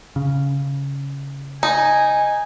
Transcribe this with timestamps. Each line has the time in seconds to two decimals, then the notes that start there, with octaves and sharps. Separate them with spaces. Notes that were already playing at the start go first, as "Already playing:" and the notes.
0.16 C#3
1.63 D#4 G#5